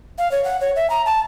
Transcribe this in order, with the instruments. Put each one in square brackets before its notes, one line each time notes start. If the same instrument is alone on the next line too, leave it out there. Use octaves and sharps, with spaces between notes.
[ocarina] F5
C#5
F#5
C#5
E5
A#5
A5